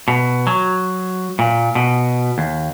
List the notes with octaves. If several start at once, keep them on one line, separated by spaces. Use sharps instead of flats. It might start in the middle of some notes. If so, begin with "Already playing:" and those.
B2
F#3
A#2
B2
D#2